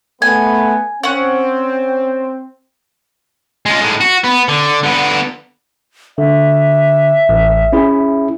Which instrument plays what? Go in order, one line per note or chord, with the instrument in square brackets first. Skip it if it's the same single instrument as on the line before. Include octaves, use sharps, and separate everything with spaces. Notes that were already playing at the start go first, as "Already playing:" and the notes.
[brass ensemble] A3 B3 [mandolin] G#5
[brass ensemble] C4 [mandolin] C#4 F#5
[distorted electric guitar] G#3 F4
A2 G#3
F#4
B3
D3
D3 B3
[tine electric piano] D3 [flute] E5
[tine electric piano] A1
C#4 E4 G#4